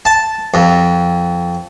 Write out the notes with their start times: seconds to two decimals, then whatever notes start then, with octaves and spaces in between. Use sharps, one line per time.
0.05 A5
0.54 F2